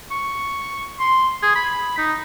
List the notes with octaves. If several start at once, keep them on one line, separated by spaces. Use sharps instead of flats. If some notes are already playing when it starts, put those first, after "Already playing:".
C#6
C6
G#4
B5
D#4